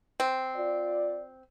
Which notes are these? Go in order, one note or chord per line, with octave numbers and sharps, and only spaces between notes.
C4
F4 D5